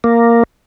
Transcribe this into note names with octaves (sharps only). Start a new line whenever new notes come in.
A#3